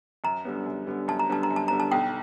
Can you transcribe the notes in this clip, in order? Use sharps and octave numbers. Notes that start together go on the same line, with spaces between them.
F#2 A#5
D3 G3 B3
F#2
D3 G3 B3
F#2 A5
A#5
D3 G3 B3 A5
A#5
F#2
A5
D3 G3 B3 A#5
A5
B1 G5